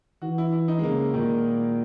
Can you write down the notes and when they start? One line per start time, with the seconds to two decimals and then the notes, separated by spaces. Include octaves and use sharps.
0.22 E3 F#4
0.38 E4
0.52 E4
0.68 D#4
0.79 G#3
0.83 C#3 A#3
1.14 A#2 D#3